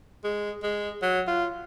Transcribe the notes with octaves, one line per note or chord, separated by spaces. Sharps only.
G#3
G#3
F#3
F4